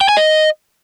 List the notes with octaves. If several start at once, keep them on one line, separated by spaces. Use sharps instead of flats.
G5
G#5
D#5